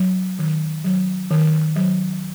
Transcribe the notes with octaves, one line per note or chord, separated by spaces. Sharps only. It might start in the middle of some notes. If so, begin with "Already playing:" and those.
Already playing: F#3
D#3
F#3
D#3
F#3